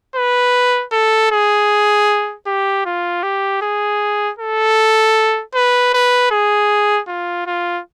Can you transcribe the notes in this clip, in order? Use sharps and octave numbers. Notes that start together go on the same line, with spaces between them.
B4
A4
G#4
G4
F4
G4
G#4
A4
B4
B4
G#4
F4
F4